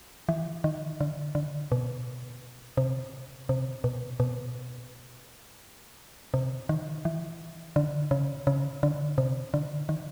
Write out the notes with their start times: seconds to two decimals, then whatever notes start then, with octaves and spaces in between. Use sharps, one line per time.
0.29 E3
0.64 D#3
1.01 D3
1.35 D3
1.72 B2
2.77 C3
3.49 C3
3.84 B2
4.20 B2
6.34 C3
6.69 D#3
7.05 E3
7.76 D3
8.11 C#3
8.47 C#3
8.83 D3
9.18 C3
9.54 D3
9.89 D#3